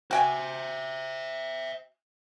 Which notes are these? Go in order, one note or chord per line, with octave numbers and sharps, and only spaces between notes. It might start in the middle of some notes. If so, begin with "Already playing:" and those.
F#4 C5 E5 G5 G#5